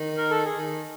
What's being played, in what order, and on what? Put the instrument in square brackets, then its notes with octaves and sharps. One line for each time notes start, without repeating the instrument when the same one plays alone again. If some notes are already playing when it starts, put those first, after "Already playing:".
Already playing: [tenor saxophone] D#3
[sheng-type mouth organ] A#4
A4
G#4
[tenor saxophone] D#3